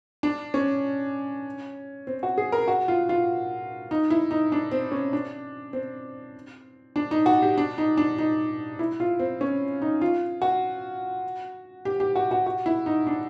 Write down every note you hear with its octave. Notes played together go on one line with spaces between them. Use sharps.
D4
C#4
C4
F#4
G#4
A#4
F#4
F4
F4
D#4
E4
D#4
D4
C4
C#4
D4
C4
D4
D#4
F#4
G4
D4
D#4
D4
D#4
E4
F4
C4
C#4
D#4
F4
F#4
G4
G4
F#4
F#4
F#4
E4
D#4
D4